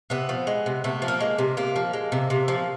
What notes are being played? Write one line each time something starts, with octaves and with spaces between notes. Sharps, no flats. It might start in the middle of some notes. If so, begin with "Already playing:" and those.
C3 B3
F3
G#3
C3
C3 A3
F3
A#3
G#3
C3
C3 A#3
F3
G#3
C3
C3
F3